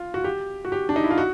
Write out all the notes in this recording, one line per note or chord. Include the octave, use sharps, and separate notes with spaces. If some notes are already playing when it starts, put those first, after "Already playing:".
Already playing: F4
F#4
G4
F#4
G4
D4
D#4
E4
F4
F#4